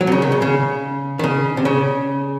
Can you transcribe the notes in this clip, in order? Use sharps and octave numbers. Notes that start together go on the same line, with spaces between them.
F#3
C3
C#3
D#3
C#3
C#3
D#3
C#3
C3
C#3